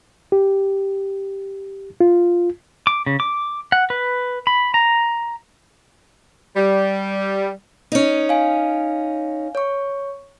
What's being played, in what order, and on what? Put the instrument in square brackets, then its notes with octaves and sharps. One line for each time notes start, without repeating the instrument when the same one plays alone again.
[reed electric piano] G4
F4
[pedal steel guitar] D6
C#3
D6
F#5
B4
B5
A#5
[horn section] G3
[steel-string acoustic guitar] C#4 D#4
[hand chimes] F5 G#5
C#5 C#6